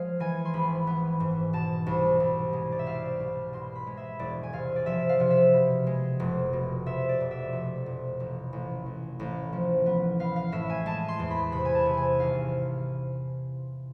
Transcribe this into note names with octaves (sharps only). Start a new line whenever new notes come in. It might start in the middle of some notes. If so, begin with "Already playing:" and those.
Already playing: F3 G#3 F5
E3 G#5
C6
G#1 B5
B3
G#2
B2 A5
C2
C2
G#3
D5
E5
C4 F5
C2
B2 C6
B5
G#3
E5
E1 D5
G#5
C3 F5
D5
F3 E5
F5
C3
E5
B2
G#3
F1
B2
C3 E5
D5
F1
E5
F1
F1
A1
A1
A1
A1
F3
B3
B3 F5
F5
A2 E5
G#5
G#3 A5
C6
E2
B5
C3 B5
G#5
A5
C3
G#5
G#1 F5